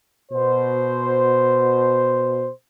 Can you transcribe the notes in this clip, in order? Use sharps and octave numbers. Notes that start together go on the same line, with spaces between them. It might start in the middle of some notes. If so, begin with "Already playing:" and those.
B2 C5